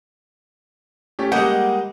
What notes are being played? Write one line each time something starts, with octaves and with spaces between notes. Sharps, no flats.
A3 C#4 G4
G3 G#3 A#3 D#5 F#5 G5